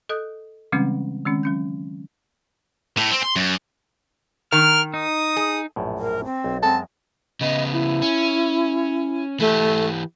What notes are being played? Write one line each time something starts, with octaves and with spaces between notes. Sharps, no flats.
A4 D#5 D#6 F#6
C#3 E3 G3 G#3 C4 C#4
D#3 G#3 C4 C#4
F#3 C#4 G6
A2
C4
C6
F#2
D#3 A#4 F6
D#4 D#6
G#4
A#1 F#2 A2
A#4
C4
B1
F#2 G#3 C4 A5
C#3 B3 D#5
E4
C#4
E3 A3 G4